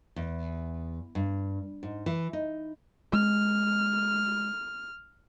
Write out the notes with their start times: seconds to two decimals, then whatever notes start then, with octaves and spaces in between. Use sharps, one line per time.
0.16 E2
1.15 G2
1.83 G#2
2.06 E3
2.33 D#4
3.13 G#3 F6